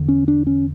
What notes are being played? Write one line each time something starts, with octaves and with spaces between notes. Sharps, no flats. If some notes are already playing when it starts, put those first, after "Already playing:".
Already playing: E2 D3
C#4
D4
C#4